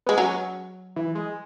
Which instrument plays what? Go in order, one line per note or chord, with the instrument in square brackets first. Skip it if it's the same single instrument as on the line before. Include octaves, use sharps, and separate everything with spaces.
[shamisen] G#3 [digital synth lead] B3
[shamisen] F#3 [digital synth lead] C#4
[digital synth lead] E3
G#3